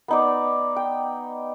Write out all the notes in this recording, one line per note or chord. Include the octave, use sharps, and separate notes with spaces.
B3 D#4 D5
G5